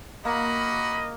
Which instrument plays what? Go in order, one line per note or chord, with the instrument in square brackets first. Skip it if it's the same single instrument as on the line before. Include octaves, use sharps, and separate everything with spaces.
[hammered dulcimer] A#3 [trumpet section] F#4 B5 [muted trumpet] D#5